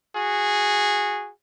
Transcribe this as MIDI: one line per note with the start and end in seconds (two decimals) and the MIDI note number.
0.14 1.30 66
0.14 1.30 68